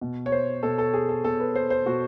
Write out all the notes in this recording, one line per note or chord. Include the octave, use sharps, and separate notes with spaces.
B2
C#5
C5
B2 A4
A4
G#4
A4
B2 A4
B4
C5
C5
B2 F#4